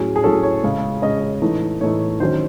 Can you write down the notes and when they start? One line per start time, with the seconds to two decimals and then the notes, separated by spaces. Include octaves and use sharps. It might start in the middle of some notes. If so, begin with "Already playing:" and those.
Already playing: A2 F#3 C#4 G#4
0.16 G#4
0.24 A2 F#3 C#4 A4
0.43 C#5
0.63 C#3 G#3 C#4
1.02 C#3 G#3 C#4 D#5
1.42 A2 E3 A3 D#4
1.81 A2 E3 A3 D#4 C#5
2.20 D#3 F#3 C#4 C5